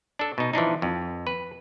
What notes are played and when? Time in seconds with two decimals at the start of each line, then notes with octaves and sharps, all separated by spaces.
0.19 D4 A4
0.38 B2 D#4
0.53 E3 F3 D4 D#4
0.82 F2
1.27 B4